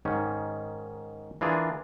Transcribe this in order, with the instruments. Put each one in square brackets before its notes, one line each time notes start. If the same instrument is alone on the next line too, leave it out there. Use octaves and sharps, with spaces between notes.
[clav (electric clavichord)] G#2 D#3 C#4
E3 D4 F4 G#4 A#4